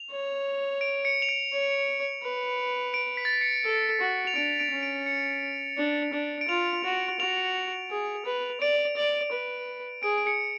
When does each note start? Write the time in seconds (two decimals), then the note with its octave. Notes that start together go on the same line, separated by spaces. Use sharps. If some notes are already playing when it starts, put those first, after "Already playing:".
Already playing: F7
0.11 C#5
0.81 D7
1.05 C#7
1.22 F7
1.29 D7
1.52 C#5
2.23 B4
2.94 D7
3.17 B6
3.25 A6
3.33 B6
3.41 C#7
3.65 A4
4.01 F#4
4.27 F7
4.36 D4 D7
4.60 D7
4.71 C#4
4.83 D7
5.06 C#7
5.77 D4
6.13 D4
6.41 D7
6.48 F4 F7
6.84 F#4
7.20 F#4 F7
7.90 G#4
8.25 B4
8.61 D5 D7
8.97 D5
9.32 B4
10.03 G#4 D7
10.18 D7
10.27 C#7